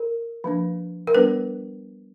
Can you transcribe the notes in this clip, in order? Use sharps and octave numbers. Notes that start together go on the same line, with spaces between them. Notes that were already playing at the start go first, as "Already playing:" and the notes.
Already playing: A#4
F3 A#3 D4
A#4
G3 B3 D4 B4